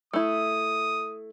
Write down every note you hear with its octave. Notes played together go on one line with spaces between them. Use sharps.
A3 E4 D#6